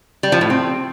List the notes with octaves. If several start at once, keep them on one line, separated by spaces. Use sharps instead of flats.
G3
F3
A2
C4